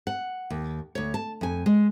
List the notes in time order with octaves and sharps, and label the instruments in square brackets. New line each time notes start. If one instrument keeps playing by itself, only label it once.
[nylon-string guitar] F#5
D#2
D2 C#5
A5
F2 G#5
G#3